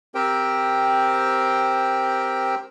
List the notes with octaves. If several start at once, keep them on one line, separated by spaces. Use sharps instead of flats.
C4 G4 A#4 C5 G5